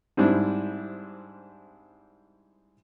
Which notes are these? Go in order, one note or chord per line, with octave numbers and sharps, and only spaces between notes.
G#2 G3 C4 D4 E4